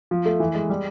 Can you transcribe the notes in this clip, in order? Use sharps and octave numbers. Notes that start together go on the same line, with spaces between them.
F3
A3
E3
G#3
G3